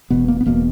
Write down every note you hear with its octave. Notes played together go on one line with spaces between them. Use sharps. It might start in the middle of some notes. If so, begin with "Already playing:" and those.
E1 E2 B2 B3
A#3
B3
E1 E2 B2 A#3